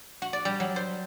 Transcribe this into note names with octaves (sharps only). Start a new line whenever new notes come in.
F#4
D5
G3
F#3
C5